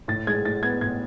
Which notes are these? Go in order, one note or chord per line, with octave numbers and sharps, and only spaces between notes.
A2 A6
G#3 G#6
A2 A6
B3 G#6
A2 G#6